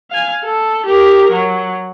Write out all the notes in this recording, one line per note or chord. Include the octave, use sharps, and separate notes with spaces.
F5 G#5
A4
G4 A#4
F#3